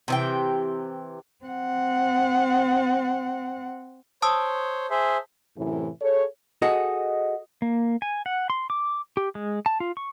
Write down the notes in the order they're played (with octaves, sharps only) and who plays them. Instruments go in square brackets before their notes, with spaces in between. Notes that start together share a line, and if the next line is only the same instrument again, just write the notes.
[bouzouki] C3 E3 G5
[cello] C4 F#5
[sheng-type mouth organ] C5 C#5 [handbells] A5 D#6 E6
[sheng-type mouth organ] G#4 C5 E5
[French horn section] F#2 A2 C3 E3
G#4 A4 C#5
[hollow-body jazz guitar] F#4 G#4 A4 [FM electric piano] D#5
[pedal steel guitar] A#3
G#5
F#5
C6
D6
G4
G#3
A5
F4
C#6